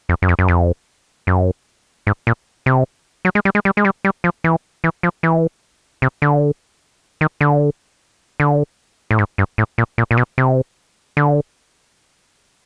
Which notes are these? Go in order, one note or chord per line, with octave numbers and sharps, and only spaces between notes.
F2
F#2
F2
F#2
F2
F#2
G#2
A#2
C3
F#3
G#3
G3
G#3
G3
G#3
G3
G3
F3
E3
E3
F3
E3
C3
D3
D#3
D3
D3
A2
G#2
G2
A2
A#2
A#2
A#2
B2
C3
D3